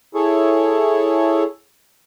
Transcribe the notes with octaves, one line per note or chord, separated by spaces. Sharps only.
E4 G#4 A4 C#5